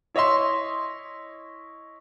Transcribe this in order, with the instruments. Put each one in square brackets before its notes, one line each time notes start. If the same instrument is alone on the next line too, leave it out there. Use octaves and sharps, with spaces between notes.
[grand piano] E4 C#5 D#5 E5 C6